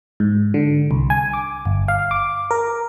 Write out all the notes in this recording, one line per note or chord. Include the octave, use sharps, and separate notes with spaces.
G#2
D3
C2
G#5
D6
G1
F5
D6
A#4